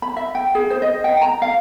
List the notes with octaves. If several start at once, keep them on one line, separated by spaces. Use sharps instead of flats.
B5
E5
G5
G#4
C5
D#5
G5
A#5
F5